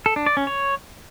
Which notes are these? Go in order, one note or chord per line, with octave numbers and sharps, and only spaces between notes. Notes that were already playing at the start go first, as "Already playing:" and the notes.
A4
D4
D5
C#4
C#5